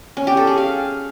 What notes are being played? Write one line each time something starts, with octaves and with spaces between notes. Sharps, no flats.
C#4
G4
A4
G#4
F5